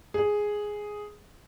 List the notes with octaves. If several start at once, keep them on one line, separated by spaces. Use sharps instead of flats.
G#4